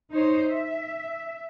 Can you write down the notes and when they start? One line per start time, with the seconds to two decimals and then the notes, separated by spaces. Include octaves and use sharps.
0.11 D#4 C5 C#5
0.49 E5